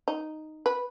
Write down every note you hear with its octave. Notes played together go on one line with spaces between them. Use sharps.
D#4
B4